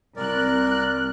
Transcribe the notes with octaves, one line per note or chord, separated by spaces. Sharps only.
C2 A#4 D5 F#6